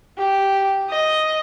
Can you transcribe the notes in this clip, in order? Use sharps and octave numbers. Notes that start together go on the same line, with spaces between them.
G4
D#5